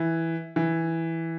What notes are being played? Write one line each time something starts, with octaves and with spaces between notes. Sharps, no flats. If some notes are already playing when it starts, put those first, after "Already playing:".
Already playing: E3
E3